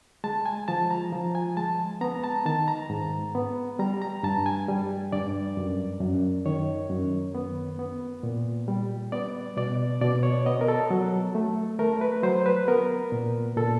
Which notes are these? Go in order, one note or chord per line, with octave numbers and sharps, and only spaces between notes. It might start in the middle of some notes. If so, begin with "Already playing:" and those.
G#3 A5
G#5
F3 A5
A#5
F3
G#5
G#3 A5
B3 A#5
A5
D#3 A5
A#5
G#2
B3
G3 A#5
A#5
G2 A5
G#5
G3
G2 D5
F#2
F#2
D#3 C#5
F#2
B3
B3
A#2
G3
B3 D5
B2 D5
B2 D5
C#5
B3 D#5
A#4
A4
F#3
A3
A3 A#4
B4
F#3 C5
B4
B3 A#4
A#2
A#2 A4